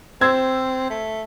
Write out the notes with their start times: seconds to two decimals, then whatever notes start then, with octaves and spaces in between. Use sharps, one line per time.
0.21 C4 C5 E6 G#6
0.90 A3